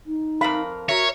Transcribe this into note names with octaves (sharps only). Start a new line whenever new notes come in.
D#4
F2 A#4 F5 B5
F#4 A#4 C#5 E5